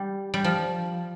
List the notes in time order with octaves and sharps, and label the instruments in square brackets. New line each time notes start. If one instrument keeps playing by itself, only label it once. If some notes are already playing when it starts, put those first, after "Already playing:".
Already playing: [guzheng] G3
G3
F3